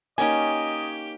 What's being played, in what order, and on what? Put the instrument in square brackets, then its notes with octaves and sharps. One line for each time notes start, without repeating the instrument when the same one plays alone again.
[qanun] A#3 C#4 D#4 [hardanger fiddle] G4 [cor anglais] D#5 [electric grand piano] G#5